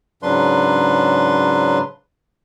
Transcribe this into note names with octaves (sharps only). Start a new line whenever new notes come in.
G#2 C#3 F#3 D4 B4 C6